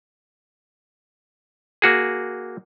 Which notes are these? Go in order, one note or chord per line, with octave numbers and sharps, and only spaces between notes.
A#3 F#4 G#4